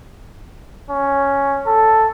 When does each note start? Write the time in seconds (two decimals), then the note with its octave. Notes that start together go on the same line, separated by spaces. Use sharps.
0.91 C#4
1.67 A4